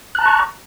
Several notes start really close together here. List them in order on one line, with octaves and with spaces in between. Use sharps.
F#6 A5 A#5 C#6